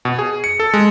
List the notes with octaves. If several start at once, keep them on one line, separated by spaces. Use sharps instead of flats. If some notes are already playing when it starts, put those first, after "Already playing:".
B2
G#4
C#7
A4
G#3